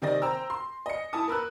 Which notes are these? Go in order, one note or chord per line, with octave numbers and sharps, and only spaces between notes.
C3 D#3 C4 D5 D#5 A#6
C5 G5 A#5 E6
C6
D#5 C#7
E4 A5 D#6
A#4 B4 E6 F#6